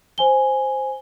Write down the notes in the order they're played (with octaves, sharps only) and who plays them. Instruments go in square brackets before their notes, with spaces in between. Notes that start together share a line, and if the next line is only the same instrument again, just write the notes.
[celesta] C5 G#5 G7